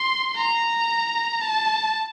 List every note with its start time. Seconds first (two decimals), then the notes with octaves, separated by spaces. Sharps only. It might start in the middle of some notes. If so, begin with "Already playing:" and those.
Already playing: C6
0.36 A#5
1.41 A5